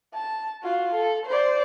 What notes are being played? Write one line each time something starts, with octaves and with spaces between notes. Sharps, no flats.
A5
F4 F#4
A4
C5 D5